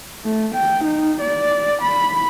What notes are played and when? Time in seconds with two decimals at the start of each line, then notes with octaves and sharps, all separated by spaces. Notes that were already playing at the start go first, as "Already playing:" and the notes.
0.25 A3
0.54 G5
0.84 D#4
1.21 D5
1.81 B5